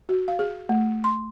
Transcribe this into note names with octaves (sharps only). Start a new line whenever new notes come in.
F#4
F5
G#4
A3
C6